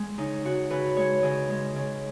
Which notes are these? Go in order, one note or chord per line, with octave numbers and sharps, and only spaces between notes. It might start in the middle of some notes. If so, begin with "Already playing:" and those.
Already playing: G#3
C#3 D#4
C#3 F#4
C#3 B4
G#3 C#5
C#3 D#5
G#3
C#3